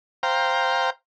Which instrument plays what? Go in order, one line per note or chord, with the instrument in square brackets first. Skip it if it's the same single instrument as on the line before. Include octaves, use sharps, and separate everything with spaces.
[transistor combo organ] C5 F5 G5 A#5